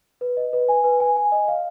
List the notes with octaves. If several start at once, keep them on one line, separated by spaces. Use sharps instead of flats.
B4
D#5
B4
G#5
B4
G#5
G#5
D#5
F5